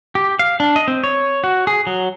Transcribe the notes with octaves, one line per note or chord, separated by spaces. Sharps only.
G4
F5
D4
D#5
C4
C#5
F#4
G#4
F#3